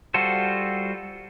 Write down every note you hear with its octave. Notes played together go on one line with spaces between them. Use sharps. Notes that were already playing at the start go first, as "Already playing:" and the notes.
G3 F4 F#4 A4 C5